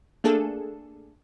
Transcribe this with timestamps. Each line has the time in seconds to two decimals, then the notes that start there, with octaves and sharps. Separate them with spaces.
0.24 A3 A#3 D4 G#4 A4